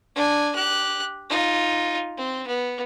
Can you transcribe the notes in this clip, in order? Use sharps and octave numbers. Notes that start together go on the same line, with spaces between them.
D4 G#5
G4 F#6
D#4 F4
C4
B3